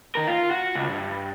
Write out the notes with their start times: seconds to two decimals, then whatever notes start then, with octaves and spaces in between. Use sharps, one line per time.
0.15 D#3 A#4
0.27 F4
0.51 F#4
0.75 C#2
0.89 G2